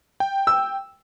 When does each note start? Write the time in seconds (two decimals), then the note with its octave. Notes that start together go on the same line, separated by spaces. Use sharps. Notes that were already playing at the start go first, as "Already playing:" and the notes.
0.20 G5
0.47 E6